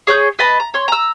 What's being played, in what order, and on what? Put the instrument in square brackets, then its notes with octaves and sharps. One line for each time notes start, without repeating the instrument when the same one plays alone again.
[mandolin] G#4 C#5 D#6 G6
B4 D#5 A5 B5
A#5
C#5 C6
A#5 E6